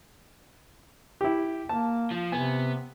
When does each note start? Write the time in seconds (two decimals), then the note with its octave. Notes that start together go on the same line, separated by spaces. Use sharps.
1.21 E4 G4
1.69 A#3 A5
2.11 F3
2.32 C3 B3 G#5